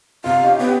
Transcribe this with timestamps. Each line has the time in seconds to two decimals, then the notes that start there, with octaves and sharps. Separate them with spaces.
0.24 C3 F4 F5
0.43 C#4 D#4 G4
0.59 B3 C#5 G5